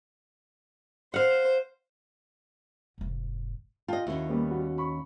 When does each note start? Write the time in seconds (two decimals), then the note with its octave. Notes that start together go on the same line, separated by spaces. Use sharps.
1.14 C5 F5 F#5
2.98 F1 G#2
3.88 F4 D#5 G5 A5
4.07 D#2 C#4 E4 F#4
4.30 G3 A#3 B3
4.51 F#4
4.78 B5 C#6